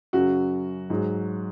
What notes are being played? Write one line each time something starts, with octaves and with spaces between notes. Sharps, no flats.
F#2 C#3 F#3 F#4
G#2 F#3